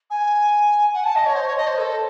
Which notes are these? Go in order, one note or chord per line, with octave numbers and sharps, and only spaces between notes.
G#5
F#5
A5
D#5
C#5
C5
C#5
D#5
C5
A4